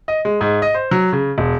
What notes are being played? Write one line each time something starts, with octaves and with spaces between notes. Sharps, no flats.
D#5
G#3
G#2
D#5
C5
F#3
C#3
E1